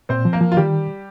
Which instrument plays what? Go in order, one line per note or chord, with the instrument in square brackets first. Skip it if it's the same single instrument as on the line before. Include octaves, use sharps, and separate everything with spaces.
[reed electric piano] A#2 [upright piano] C4 C5
[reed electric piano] F3
[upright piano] A#3 A#4
[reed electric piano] F3
[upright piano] F4
[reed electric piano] D#3 [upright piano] G3 G4